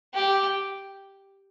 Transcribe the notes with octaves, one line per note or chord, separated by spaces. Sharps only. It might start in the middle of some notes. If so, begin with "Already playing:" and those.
G4